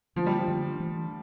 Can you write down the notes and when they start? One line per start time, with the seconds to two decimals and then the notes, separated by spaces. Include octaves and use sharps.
0.16 D3 F3 A3 D4
0.26 G3
0.38 F3
0.48 D3 G3 D4
0.80 E3 A3 D4